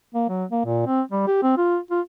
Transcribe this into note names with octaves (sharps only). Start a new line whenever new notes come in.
A#3
F#3
A#3
A#2
C4
G3
G4
C4
F4
F4